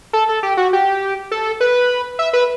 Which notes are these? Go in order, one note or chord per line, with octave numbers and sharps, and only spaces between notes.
A4
A4
G4
F#4
G4
A4
B4
E5
B4